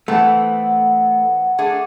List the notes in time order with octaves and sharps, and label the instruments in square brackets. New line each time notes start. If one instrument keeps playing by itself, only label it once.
[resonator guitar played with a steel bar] E3 B3 C4 [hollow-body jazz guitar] A3 [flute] F#5
[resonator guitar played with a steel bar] A3 D4 G#4